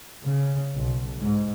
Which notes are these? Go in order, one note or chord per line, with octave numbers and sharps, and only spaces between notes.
C#3
B1
G#2